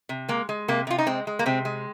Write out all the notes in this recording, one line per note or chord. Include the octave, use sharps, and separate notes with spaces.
C3
G#3 A#3
G#3
C3 A#3
C3 F4
D#4
G#3 C4
G#3
A#3
C3 C4
G#3